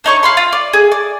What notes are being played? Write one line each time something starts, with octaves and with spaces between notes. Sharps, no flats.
D4 D#4 C#5 C#6
F5 B5 C6
F4
D5
G#4
D5